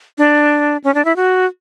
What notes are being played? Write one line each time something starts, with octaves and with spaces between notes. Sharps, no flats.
D4
C#4
D4
E4
F#4